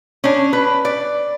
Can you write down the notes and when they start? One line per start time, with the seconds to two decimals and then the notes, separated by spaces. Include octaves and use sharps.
0.24 C#4 D4
0.53 B4
0.85 D5